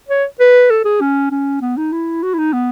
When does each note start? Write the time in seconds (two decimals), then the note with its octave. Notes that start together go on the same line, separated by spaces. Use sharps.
0.09 C#5
0.40 B4
0.70 A4
0.85 G#4
1.01 C#4
1.31 C#4
1.62 B3
1.77 D#4
1.92 E4
2.23 F#4
2.34 E4
2.38 D#4
2.53 B3